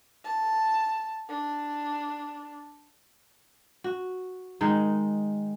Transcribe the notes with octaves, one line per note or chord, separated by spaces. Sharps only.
A5
D4
F#4
D#3 G#3 D#4